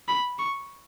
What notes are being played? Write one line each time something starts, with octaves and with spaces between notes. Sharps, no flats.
B5
C#6